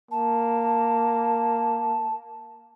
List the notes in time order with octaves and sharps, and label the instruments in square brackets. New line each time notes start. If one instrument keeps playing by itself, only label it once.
[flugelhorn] A#3 [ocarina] A5